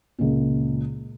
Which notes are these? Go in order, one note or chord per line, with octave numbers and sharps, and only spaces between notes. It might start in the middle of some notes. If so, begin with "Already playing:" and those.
C#2 A#2